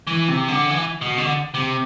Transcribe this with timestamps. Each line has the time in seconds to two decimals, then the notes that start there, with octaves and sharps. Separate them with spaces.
0.07 E3
0.28 C3
0.48 D3
0.70 E3
1.01 B2
1.18 D3
1.54 C3